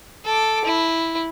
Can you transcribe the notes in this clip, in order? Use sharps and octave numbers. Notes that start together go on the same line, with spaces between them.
A4 D6
E4